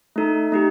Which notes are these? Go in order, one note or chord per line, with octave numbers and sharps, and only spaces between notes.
A3 D#4 A4
A3 D#4 G4